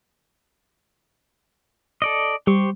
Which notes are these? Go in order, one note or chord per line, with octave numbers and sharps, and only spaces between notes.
A4 D5 D#5
G3 G4 C5 C#6